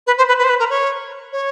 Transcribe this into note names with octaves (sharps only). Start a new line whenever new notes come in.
B4
C5
B4
B4
C5
B4
A#4
C#5
C#5